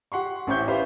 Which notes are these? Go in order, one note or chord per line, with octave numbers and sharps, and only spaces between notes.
G4 F#5 C6 C#6
A1 C#4 C5 E5 C#6 G6
G4 B4 C5 E5 F5